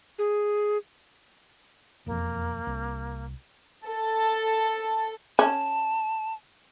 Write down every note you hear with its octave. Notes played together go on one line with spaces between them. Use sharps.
G#4
E1 F2 A#3
C2
A4
C#4 A5